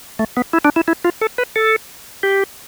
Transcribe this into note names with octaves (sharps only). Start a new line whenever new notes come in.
A3
B3
E4
D4
E4
E4
F4
A4
B4
A4
G4